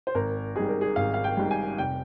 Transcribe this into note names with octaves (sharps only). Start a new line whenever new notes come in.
C5
G#1 A#4
G#2 G3 G#4
A#4
G#4
G#1 F5
F5
G5
G#2 G3
G#5
F1 G5